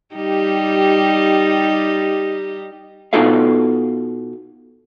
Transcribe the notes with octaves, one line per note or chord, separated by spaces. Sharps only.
G3 D#4 G4
B2 D#4 F4 A4 B4 F5